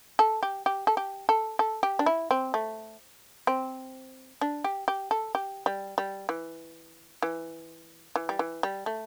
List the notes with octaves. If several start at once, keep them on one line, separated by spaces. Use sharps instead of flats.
A4
G4
G4
A4
G4
A4
A4
G4
D4
E4
C4
A3
C4
D4
G4
G4
A4
G4
G3
G3
E3
E3
E3
G3
E3
G3
A3